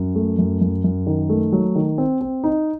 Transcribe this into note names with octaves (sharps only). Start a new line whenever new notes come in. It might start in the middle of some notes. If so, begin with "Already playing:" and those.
Already playing: F#2
A3
F#2
F#2
F#2
D#3
A3
F#3
D#3
C4
C4
D#4